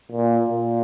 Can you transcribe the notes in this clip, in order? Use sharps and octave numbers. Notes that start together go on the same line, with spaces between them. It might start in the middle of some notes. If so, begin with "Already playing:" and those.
A#2
A#2